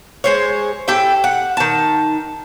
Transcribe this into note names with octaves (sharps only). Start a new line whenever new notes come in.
G#3 C5 C#5
E4 G4 A4 G5
F#5
D#3 A5